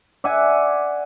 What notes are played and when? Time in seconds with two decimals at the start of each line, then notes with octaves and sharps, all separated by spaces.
0.24 D5 E5 F#5 G#5